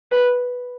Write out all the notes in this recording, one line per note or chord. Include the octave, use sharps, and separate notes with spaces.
B4